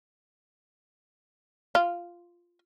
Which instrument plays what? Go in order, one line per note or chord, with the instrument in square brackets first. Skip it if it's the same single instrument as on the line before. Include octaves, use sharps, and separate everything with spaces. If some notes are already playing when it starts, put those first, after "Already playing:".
[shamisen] F4